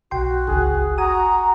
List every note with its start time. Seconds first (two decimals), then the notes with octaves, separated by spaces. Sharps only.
0.11 B1 F#4 G5 C6
0.48 G1 C#2 G#4
0.98 F#4 G#5 A#5 D#6